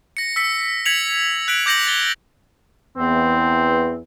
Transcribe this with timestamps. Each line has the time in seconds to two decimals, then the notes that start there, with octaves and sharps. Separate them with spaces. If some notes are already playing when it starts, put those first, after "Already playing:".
0.17 A#6 C#7
0.36 E6 B6 C#7
0.85 G#6 B6 C#7 F7 F#7
1.48 F#6 B6 D7 F#7
1.66 D6 G6 A#6 C#7 F#7
1.87 A6 G7
2.98 E2 B3 C4